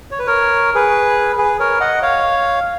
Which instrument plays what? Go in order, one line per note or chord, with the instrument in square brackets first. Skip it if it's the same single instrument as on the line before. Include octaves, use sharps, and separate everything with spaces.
[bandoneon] C#5
B4
A#4 C#5
G#4 B4
G#4 B4
A#4 C#5
D#5 F#5
C#5 F5